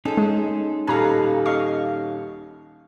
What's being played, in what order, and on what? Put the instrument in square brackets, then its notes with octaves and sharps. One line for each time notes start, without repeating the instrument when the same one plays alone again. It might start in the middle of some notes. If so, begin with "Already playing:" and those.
[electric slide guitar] C#4 D#4 G#4 [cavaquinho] A4 C5
[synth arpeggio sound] G#3
[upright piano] D#1 A4 [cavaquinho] B4 F5 [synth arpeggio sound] G#5 A#5
[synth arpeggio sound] D#5 C#6 [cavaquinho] F5